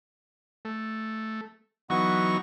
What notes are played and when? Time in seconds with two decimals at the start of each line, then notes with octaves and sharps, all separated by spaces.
0.65 A3
1.90 E3 F#3 B3 D#4 C#6